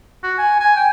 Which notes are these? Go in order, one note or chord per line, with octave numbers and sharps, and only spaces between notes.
F#4
G#5
G#5
G5